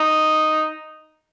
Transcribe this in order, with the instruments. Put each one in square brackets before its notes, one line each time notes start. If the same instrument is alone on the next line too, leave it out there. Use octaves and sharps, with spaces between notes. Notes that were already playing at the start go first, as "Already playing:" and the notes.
Already playing: [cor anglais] D#4